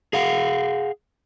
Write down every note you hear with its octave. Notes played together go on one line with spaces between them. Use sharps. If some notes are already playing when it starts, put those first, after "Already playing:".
G#4 F5 F#5